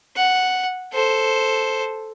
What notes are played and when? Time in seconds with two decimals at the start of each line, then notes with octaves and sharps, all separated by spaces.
0.16 F#5
0.93 A4 C5